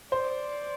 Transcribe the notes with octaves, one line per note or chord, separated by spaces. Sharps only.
C5 D5